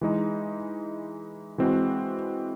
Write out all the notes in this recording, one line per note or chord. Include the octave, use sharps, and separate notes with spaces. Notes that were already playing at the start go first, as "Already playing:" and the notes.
E3 G#3 D#4
E3 G#3 C4 F#4